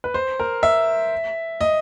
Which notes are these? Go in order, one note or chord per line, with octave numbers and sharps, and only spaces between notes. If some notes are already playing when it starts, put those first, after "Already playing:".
B4
C5
A#4
E5
D#5